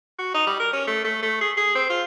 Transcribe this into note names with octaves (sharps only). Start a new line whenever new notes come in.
F#4
D#4
G3
A#4
C#4
A3
A3
A3
G#4
G#4
C4
F4